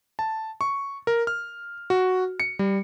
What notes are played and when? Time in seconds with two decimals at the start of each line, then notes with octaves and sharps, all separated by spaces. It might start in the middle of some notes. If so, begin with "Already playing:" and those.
0.19 A5
0.61 C#6
1.07 A#4
1.27 F6
1.90 F#4
2.40 C#7
2.59 G3